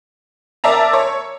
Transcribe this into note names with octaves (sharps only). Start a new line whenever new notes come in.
A#4 D5 E5 A5 A#5
C#5